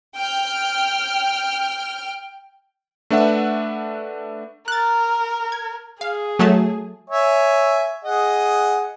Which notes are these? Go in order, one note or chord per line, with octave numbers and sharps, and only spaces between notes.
G5 F6
A3 D4 B4 E5 F#5
A#4 F#6 A6
G#6
G#4 F5
F#3 A3 A5
C#5 E5 G#5
G#4 D#5 F#5